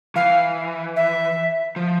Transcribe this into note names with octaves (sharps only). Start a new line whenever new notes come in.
E3 F5
E5
F3